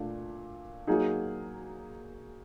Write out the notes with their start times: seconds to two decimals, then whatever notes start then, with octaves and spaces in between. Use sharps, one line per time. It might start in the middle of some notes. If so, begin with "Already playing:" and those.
Already playing: A#2 A3 D4
0.87 F#3 A#3 D#4 G#4